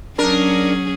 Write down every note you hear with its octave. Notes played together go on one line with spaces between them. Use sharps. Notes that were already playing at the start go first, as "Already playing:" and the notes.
F#3 C#4 D4 G#4 A#4